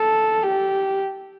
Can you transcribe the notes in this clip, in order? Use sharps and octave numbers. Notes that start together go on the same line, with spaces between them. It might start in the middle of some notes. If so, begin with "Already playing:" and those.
Already playing: A4
G4